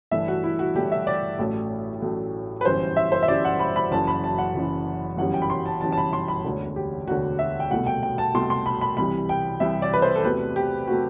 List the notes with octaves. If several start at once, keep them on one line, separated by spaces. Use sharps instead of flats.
G1 G2 E3 A3 E5
F#4
E4
F#4
G1 G2 E3 A3 G4
E5
D5
A1 A2 F#3 A3
A1 A2 F#3 A3
B4
G1 F#2 E3 G3 C5
E5
C5
E5
G1 F#2 E3 G3 D5
F#5
B5
B5
F#1 F#2 E3 A5
B5
A5
F#5
F#1 F#2 E3
G1 F#2 E3 G3 F#5
G5
B5
C6
A5
G1 F#2 E3 G3 A5
A5
B5
C6
B5
E1 D2 D3
G4
E1 D2 D3 F#4
E5
G5
C2 B2 A3 F#5
G5
G5
A5
C2 B2 A3 C6
C6
B5
B5
C2 C3 E3 G3 B5
G5
C2 C3 E3 G3 E5
D5
B4
C5
A4
E2 C3 F#3 A3 B4
G4
C3 F#3 A3 F#4